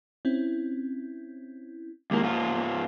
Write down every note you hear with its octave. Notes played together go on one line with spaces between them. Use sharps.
C4 C#4 E4
D#2 G#3 A#3 E4
G#2 A#3 F4